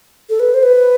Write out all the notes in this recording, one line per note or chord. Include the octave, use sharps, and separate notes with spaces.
A4
B4
C5
B4